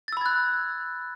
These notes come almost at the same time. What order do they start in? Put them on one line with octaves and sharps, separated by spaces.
A6 E6 B5 G#6 F#6